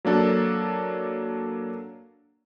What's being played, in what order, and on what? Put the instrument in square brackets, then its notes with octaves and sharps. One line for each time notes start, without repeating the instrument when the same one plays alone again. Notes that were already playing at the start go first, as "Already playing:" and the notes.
[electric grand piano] F#3 A#3 D4 A4